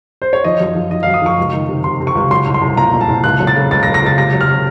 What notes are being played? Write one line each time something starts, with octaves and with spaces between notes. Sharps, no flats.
C5
C#5
F3 D#5
F#2
F3
F3 D#5
F5
F#2
D#6
F3 C#6
C#2
D#3
C3
C3 C6
C3
C#6
C#2
F#3 C6
C2
C6
C2
A#2 A#5
A#2
A5
C2
C#2 F#6
F#3
A6
C#3
C#2 A6
A#6
C#2
A#6
C#2 A6
C3 A#6
F#3
F6
C3